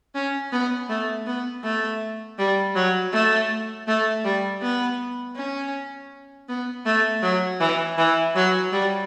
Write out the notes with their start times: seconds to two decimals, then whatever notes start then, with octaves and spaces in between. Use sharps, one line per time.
0.15 C#4
0.52 B3
0.89 A3
1.27 B3
1.64 A3
2.39 G3
2.75 F#3
3.13 A3
3.88 A3
4.25 G3
4.62 B3
5.37 C#4
6.49 B3
6.86 A3
7.23 F#3
7.60 E3
7.98 E3
8.35 F#3
8.72 G3